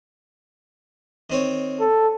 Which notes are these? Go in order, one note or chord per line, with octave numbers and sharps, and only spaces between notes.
D#3 C4 C#5
A4